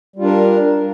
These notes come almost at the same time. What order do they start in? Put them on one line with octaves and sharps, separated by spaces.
G3 F4 D4 A#4